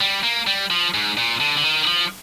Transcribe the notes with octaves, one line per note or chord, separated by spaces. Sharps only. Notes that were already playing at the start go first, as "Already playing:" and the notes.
G3
A#3
G3
F3
G#2
A#2
D3
D3
D#3
F3